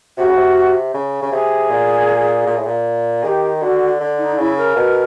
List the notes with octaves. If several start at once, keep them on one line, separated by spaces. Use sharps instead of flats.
C3 F#4
C#3
C3
C#3
C#3
C3 G#4
A#2
A#2
A2
A#2
D#3 G4 G#4
D3 F#4
D3
D#4
C#3 E4
A#4
B2